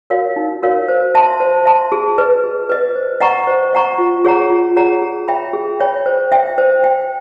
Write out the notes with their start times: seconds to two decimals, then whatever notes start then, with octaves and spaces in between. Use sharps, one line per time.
0.10 F#4 A#4 C#5 F5
0.36 D#4
0.63 F#4 A#4 C#5 F5
0.88 C5
1.15 E5 A5 C6
1.40 C5
1.66 E5 A5 C6
1.92 G#4
2.18 B4 D#5
2.44 G#4
2.69 B4 D#5
2.96 C5
3.21 D#5 F#5 A#5 C#6
3.47 C5
3.73 D#5 F#5 A#5 C#6
3.98 F4
4.25 G#4 C#5 F#5 A#5
4.50 F4
4.76 G#4 C#5 F#5 A#5
5.02 G#4
5.28 C#5 E5 G5 B5
5.53 G#4
5.80 C#5 E5 G5 B5
6.06 C5
6.32 E5 G5
6.58 C5
6.83 E5 G5